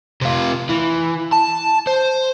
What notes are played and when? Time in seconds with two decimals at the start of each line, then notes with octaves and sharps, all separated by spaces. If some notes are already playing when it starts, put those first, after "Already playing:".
0.21 C3 F4
0.69 E3
1.32 A5
1.87 C5